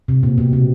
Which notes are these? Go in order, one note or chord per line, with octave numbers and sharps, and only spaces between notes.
C3
A#2
B2
C3